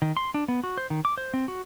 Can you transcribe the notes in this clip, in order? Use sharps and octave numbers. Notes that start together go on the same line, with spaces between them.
D#3
C6
D4
B3
F#4
C5
D#3
D6
C5
C4
F#4